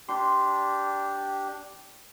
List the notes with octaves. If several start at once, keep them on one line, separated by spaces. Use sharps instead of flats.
D4 G4 C6